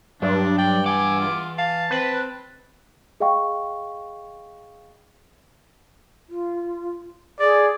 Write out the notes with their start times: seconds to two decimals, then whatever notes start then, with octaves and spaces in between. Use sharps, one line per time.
0.22 G2 F#3 D4
0.58 D5 G5
0.86 E3 F#5 G#5 D6
1.20 F4
1.58 F5 A5
1.91 C4 B4
3.20 G#4 D#5 F5 G5 C#6
6.29 F4
7.40 G#4 D5